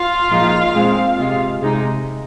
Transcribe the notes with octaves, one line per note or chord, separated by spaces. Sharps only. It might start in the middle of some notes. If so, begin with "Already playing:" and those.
Already playing: F4 F5
A#2 F3 G#3 D#4
A#2 G#3 C4 F4
C3 G#3 F4
C3 G#3 D#4